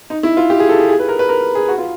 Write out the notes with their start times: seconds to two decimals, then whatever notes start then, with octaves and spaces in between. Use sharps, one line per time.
0.10 D#4
0.23 E4
0.37 F4
0.50 G4
0.60 G#4
0.69 A4
0.79 G#4
0.89 G#4
0.99 B4
1.09 A#4
1.19 B4
1.29 A#4
1.55 G#4
1.68 F#4
1.78 F4